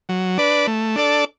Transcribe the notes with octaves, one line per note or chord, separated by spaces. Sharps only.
F#3
D4 B4 D5
A3
D4 A4 D5